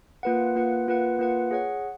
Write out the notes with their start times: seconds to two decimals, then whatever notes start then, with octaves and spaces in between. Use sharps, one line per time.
0.23 A#3 F4 B4 F#5
0.55 A#3 F4 B4 F#5
0.88 A#3 F4 B4 F#5
1.19 A#3 F4 B4 F#5
1.51 G#4 C#5 F#5